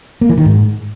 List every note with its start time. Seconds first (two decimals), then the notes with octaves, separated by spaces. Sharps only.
0.21 A#3
0.29 E3
0.37 D#3
0.45 G#2